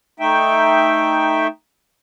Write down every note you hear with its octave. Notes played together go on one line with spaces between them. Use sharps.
A3 D#4 E5 G5